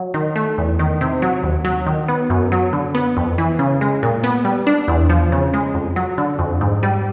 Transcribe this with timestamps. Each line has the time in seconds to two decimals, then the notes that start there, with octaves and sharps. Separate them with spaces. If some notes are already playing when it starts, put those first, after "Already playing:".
Already playing: F#3
0.14 D#3
0.36 A3
0.58 E2
0.79 D#3
1.01 C3
1.22 F#3
1.43 D#2
1.65 F#3
1.87 D#3
2.08 B3
2.30 F#2
2.52 F#3
2.73 D3
2.95 B3
3.17 F2
3.38 E3
3.59 C#3
3.81 G#3
4.03 A#2
4.24 B3
4.45 G3
4.67 D4
4.88 E2
5.10 F3
5.32 C#3
5.54 G#3
5.74 F2
5.96 F#3
6.18 D3
6.39 F2
6.61 G#2
6.83 G3